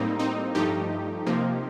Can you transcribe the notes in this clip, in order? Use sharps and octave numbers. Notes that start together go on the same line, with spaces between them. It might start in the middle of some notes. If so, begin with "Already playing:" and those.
Already playing: A2 G3 A#3 C4 D#4
C4 D#4
G2 F3 A3 D#4 G4
C3 F3 A#3